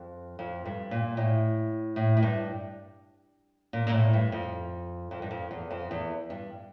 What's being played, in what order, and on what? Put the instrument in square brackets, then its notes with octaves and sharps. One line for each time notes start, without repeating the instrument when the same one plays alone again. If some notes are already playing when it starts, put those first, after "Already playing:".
Already playing: [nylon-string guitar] F2
F2
G2
A#2
A2
A2
A2
G2
A#2
A#2
A2
G2
F2
F2
G2
F2
E2
F2
E2
G2